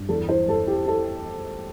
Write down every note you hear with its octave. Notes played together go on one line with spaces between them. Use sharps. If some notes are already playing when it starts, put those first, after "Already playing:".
Already playing: G2
E2 A4
E3 C5
E2 A4
E3 G4
E3 A4